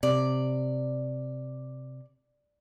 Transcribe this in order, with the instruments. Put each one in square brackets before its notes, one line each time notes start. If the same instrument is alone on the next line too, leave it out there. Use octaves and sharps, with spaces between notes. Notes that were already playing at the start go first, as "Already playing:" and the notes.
[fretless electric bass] C3 [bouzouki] D5